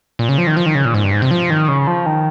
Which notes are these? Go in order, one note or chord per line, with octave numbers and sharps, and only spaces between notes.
A#2
C#3
F3
D#3
F3
D#3
C#3
A#2
G#2
G2
G#2
C3
F3
D#3
C#3
F3
D#3